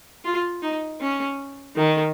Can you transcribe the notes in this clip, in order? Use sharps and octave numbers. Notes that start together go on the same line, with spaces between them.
F4
D#4
C#4
D#3